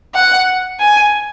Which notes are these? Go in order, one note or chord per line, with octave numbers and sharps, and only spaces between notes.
F#5
G#5